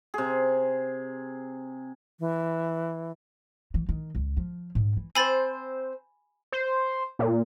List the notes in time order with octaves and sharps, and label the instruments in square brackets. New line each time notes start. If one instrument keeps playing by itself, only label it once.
[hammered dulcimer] C3 G#4
[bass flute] E3
[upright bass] E3
D#3
C#2
F3
G#2
E3
[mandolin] C4 C5 [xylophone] G#5 B5 A6
[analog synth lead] C5
A#2